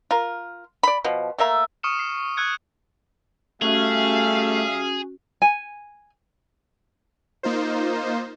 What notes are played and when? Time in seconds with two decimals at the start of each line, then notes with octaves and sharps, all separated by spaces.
0.11 F4 A#4
0.83 D5 B5
1.04 B2 F3
1.38 A3 A#3 E5 A#5
1.83 C#6 D#6 F6 C#7 E7
1.99 C7
2.37 C#6 E6 F#6 G#6 C#7
3.62 G3 A3 C#4 F#4 G#4 E5 F5
5.42 G#5
7.43 A#3 D#4 F4 C5